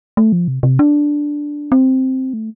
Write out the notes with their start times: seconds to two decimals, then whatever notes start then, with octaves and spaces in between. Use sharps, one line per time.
0.17 A3
0.32 F3
0.48 C3
0.63 C3
0.79 D4
1.72 C4
2.33 A3